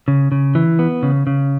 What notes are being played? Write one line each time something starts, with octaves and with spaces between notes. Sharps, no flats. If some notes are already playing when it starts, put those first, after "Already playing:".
C#3
C#3
E3
B3
C#3
C#3